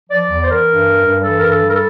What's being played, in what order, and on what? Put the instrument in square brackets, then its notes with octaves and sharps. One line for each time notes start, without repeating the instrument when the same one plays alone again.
[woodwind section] F3 D5
E2
C5
E3 A#4
G2
G3
G2
E3 A4
G2 A#4
A4
G3
A#4
A4